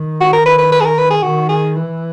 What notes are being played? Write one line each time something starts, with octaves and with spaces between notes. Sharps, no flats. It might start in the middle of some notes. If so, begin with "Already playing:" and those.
Already playing: D#3
F#4
A#4
B4
B4
B4
G#4
A#4
B4
G#4
D#3 F#4
G#4
E3